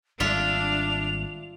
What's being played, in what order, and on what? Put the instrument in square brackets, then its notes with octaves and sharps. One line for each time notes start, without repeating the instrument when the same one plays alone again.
[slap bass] G#1 G3 [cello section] D4 [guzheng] F4 E5 [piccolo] F7